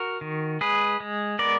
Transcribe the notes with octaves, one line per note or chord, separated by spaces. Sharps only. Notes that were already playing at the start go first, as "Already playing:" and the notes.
Already playing: F#4 A#4
D#3
G#3 G#4 B4
G#3
B3 A#4 D5